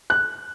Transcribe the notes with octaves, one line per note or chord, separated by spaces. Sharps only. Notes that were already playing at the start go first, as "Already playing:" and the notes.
F#6